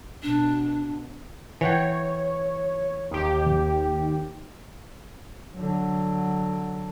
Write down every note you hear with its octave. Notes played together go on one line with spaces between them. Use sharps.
B2 D4
E3 C#5 F#5 G5
D#2 G4
D3 F#3